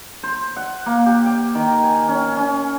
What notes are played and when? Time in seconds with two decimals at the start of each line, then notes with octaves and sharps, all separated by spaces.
0.23 C5
0.56 F#5
0.86 A#3
1.06 G4
1.26 G5
1.55 D#3
1.84 G#5
2.09 C#4
2.36 C#4